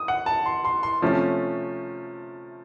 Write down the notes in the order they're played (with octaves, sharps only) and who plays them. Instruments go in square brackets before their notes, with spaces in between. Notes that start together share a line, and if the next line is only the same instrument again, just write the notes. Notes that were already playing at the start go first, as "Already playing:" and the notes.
Already playing: [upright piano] D#6
F#5
A5
C6
C6
C6
C3 F3 A3 C#4